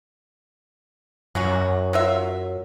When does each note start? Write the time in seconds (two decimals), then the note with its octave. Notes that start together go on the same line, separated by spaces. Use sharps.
1.35 F#2 F#3 C#4 F#4
1.93 F#3 F4 E5